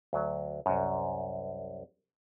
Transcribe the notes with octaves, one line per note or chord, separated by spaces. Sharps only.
D2 F#3
C2 F#2